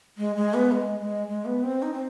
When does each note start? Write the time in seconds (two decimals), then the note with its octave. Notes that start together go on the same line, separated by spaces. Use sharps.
0.18 G#3
0.36 G#3
0.54 B3
0.72 G#3
1.00 G#3
1.28 G#3
1.45 B3
1.64 C4
1.82 D#4
1.93 C4